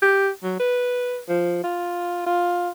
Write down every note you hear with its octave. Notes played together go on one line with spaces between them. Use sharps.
G4
F#3
B4
F3
F4
F4